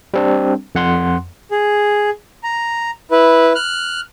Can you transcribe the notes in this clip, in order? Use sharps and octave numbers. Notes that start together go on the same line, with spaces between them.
G3 C4 D4
F2 F#5 C6
G#4
A#5
E4 B4
F6 F#6